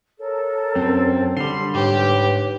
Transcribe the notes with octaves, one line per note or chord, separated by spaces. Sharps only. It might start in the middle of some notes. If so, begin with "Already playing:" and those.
A4 A#4 C#5
F#2 C4
D3 G3 C6
G#2 G4 B4 C#5